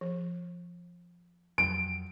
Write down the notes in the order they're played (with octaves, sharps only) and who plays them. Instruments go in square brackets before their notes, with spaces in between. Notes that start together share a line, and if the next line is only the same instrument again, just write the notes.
[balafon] F3
[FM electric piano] F2 F#3 G5 [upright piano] D7